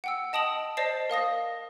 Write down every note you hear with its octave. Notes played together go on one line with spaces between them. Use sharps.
F#5 G5 E6
D#5 A5 D#6 D7 F#7
C5 D5 D#5 A5 C7
A#4 F5 D#6 A#6